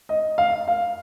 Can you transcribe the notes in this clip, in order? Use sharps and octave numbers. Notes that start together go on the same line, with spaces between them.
D#5
F5
F5